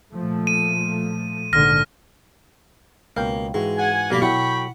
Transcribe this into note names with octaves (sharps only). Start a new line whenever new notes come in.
A#2 F3 A3
D#7
A#1 G#2 D3 F6 A#6
C#2 B2 A#3 F5 G5
G#2 E3 G#3 F#4
F#5 G#5
B1 G3 A#3 B5
B2 F#3 E4 A4 F#5 G5 B5 C#6